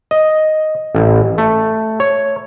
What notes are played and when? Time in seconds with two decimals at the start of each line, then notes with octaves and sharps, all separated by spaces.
0.11 D#5
0.95 A1
1.38 A3
2.00 C#5